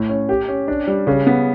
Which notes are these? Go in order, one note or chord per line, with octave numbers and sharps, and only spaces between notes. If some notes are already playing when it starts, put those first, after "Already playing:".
Already playing: A2
C#4
G4
C#4
D4
G3
C#3
B3